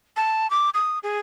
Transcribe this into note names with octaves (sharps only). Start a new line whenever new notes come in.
A5
D6
D#6
G#4